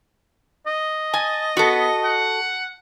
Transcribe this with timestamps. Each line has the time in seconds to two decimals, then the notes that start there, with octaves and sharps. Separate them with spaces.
0.67 D#5
1.14 G#5 A5
1.57 B3 F#4 A4
2.05 F#5